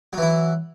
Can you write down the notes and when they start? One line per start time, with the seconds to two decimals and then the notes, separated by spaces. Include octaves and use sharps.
0.13 F#3
0.18 E3
0.22 E4